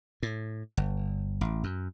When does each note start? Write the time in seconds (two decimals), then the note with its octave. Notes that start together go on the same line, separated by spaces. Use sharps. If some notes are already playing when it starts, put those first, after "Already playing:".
0.23 A2
0.77 G1
1.41 A1
1.64 F#2